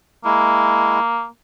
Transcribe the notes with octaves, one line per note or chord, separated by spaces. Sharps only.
G#3 A#3 E4